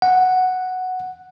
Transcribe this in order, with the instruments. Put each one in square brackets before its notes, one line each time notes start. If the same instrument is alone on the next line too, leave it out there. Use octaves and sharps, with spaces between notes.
[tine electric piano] F#5